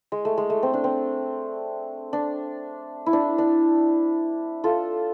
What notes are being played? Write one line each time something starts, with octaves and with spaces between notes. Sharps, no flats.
G#3
A3
G#3
A3
C4
D4
C4
D4
E4
D4
D4
F4 A4